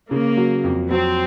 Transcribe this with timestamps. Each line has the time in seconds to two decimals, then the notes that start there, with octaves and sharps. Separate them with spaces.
0.10 C#3 A#3
0.37 F#3
0.64 F2
0.90 F#3 C4